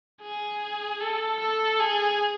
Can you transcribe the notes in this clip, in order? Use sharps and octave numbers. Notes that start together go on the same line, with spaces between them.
G#4
A4
A4
G#4